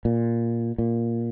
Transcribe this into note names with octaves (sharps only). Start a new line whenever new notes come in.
A#2
A#2